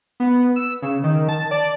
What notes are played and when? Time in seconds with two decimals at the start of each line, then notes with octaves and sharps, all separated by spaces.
0.20 B3
0.56 E6
0.82 C#3
1.04 D#3
1.29 A5
1.51 D5